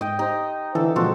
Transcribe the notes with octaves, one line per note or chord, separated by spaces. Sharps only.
G#2 D#5 G5
D#4 G4 C5
D3 E3 A4
A#2 C#3 F3 G#3 C4 F#4 A4